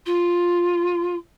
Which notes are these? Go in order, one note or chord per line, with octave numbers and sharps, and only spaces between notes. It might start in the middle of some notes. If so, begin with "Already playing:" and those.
F4